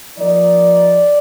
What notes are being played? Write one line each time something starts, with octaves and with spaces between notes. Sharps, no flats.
F3 A#3 D#4 D5